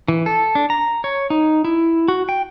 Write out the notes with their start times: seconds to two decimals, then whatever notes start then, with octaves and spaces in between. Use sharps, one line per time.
0.08 E3
0.26 A4
0.55 D4
0.70 A#5
1.04 C#5
1.30 D#4
1.64 E4
2.08 F#4
2.29 G5